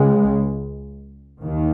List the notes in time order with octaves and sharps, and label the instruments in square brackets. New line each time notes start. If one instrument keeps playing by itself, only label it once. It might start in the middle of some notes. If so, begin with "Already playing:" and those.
Already playing: [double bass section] C#2 C#3 G#3
D#2 D#3